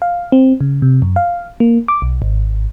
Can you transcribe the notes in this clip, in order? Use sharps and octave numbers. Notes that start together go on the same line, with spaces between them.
F5
C4
C#3
C3
F#2
F5
A#3
D6
B1
G#1